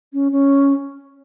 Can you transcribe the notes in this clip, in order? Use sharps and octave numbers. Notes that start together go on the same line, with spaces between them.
C#4
C#4